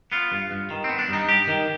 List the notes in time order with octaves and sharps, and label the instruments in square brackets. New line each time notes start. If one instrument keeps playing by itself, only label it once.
[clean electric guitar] B3 F4
G2
G2
D#3
B3 C4
D4
G2 D#4
G2 G4
D#3